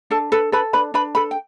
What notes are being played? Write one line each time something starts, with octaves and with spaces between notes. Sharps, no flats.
D4 A4 A5
A4 B4 B5
A4 B4 B5
D4 B4 B5
D4 B4 B5
A4 B4 B5
G5